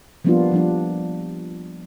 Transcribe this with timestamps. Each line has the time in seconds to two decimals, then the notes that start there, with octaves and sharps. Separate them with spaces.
0.24 F3 G3 A#3 B3 D4 F4
0.52 F3 G3 D4